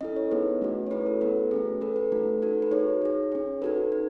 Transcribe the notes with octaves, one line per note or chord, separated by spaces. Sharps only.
C#4 E4 A4 D#5
C#5
B3 D#4 G#4 B4
A3 C#4 F#4
C#5
A3 C#4 E4 G#4 B4
A4
B3 F#4 A4 B4
A3 C#4 G#4
C#4 F#4 A4 B4
B4
A3 D#4 F#4 A4
D#4 F#4 A4
B4
D#4 G#4 C#5
D#4 G#4
C#4 G#4
D#4 F#4 A4 B4
D#4